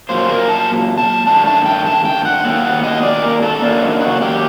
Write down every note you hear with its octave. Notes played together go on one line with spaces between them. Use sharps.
A#2 F#3 A#3 C5
A#4
A5
A5
G2 D#3 A3 A5
A5
G5
A5
G5
F#5
F#2 D#3 F#3 A#3 G5
F#5
D#5
D5
A#4
A4
F#2 F#3 A#3 D4
D#4
F#4
G4